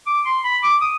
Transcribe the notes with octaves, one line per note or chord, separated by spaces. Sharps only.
D6
C6
B5
D6
D#6